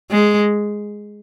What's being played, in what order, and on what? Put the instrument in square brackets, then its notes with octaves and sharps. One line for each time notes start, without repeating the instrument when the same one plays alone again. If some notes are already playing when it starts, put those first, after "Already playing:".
[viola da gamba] G#3